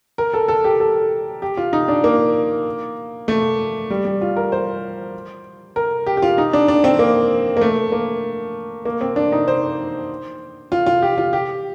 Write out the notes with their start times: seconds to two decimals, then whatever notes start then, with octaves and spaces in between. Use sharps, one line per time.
0.18 A#4
0.34 A4
0.48 A4
0.64 G4
0.80 A4
1.42 G4
1.57 F4
1.73 D#4
1.88 D4
2.04 A#3
3.28 A3
3.90 G3
4.05 G3
4.21 F4
4.36 A#4
4.52 C5
5.76 A#4
6.06 G4
6.17 G4
6.22 F4
6.38 D#4
6.53 D4
6.68 D4
6.84 C4
6.99 A#3
7.57 A#3
7.61 A3
7.92 A#3
8.85 A#3
9.01 C4
9.16 D4
9.32 D#4
9.48 C5
10.72 F4
10.86 F4
11.02 G4
11.18 F4
11.33 G4